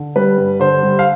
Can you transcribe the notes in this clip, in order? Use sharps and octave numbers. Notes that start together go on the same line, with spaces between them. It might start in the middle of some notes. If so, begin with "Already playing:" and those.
Already playing: D3
G3 B4
G2
D3 C5
G3
F5